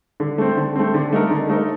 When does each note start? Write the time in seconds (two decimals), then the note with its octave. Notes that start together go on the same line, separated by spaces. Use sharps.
0.20 D3
0.38 A3 C4
0.57 D3
0.76 A3 C4
0.94 D3
1.13 A3 D#4 A#4
1.31 D3
1.49 A3 D#4 A#4